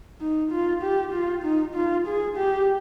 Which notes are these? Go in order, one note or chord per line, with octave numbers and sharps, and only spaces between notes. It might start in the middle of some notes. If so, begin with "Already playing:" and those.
D#4
F4
G4
F4
D#4
F4
G#4
G4